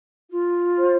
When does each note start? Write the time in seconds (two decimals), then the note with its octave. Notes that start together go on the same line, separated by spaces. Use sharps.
0.29 F4
0.77 C5